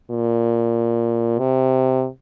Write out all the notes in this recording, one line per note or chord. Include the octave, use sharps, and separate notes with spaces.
A#2
C3